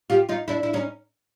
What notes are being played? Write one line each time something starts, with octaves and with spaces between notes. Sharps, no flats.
F4 G4
D#4 F4
D4 E4
E4
C#4 D#4